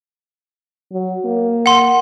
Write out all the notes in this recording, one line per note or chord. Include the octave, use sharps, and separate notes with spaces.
F#3
A#3
F#5 C6